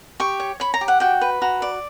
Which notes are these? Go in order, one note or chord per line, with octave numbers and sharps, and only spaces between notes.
G4 C#6
C#5
C#5 B5
A#5
G4
F#5
F#4 G5
B4
F#4 A#5
D5